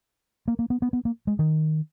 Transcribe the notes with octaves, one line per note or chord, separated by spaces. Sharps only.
A#3
A#3
B3
B3
B3
A#3
G#3
D#3